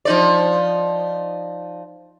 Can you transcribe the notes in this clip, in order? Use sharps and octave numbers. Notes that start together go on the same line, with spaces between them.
F3 D#4 D5